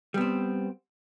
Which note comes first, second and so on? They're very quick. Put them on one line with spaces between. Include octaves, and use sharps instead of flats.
G3 B3 C4